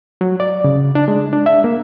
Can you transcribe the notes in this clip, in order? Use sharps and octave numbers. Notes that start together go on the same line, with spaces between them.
F#3
D5
C#3
D4
G#3
D4
E5
A#3